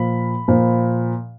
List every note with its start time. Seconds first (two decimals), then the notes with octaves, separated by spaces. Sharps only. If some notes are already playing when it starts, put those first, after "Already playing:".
Already playing: A#2 F3 B5
0.48 A#2 F3